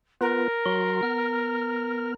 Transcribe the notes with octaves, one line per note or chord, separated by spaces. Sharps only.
B3 F4 A#4 B4
F#3 F#4 C6
B3 F6